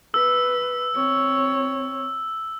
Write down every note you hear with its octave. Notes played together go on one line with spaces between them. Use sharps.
B4 E6
C4 C#5